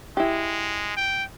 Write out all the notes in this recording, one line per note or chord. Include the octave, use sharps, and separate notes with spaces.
G#3 E4 G4
G5